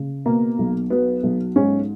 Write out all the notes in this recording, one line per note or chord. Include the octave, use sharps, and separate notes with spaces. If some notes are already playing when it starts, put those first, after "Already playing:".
Already playing: C#3
B2 A#3
B1
F#3 B3
B1
G#2 C#4